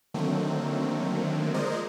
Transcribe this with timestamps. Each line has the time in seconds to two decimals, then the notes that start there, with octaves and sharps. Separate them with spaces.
0.14 D3 D#3 F#3 A3 A#3 C4
1.54 F3 G#3 A#4 C5 D5 D#5